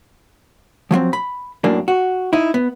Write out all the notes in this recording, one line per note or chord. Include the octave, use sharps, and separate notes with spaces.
F3 F#3 A#3 C4
B5
F#2 A2 A#3 D4
F#4
D#4 E4
B3